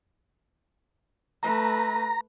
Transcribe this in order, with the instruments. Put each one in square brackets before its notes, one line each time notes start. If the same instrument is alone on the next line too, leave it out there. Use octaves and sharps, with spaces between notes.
[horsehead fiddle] A3 B4 [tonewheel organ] A#5